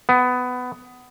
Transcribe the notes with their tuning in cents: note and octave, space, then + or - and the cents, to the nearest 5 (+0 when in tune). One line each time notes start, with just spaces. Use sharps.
B3 +15